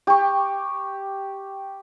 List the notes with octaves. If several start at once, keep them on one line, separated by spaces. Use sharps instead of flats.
G4 C#6